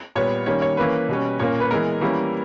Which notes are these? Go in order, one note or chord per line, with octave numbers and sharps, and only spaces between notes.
A#2 G3 B3 C#5
D#3 G3 A#3 C#4 C#5
C#5
E3 A#3 C#4 B4
B2 G3 C#4
A#2 A#3 C#4 C#5
B4
E3 G#3 B3 A#4
E3 G3 A#3 C#4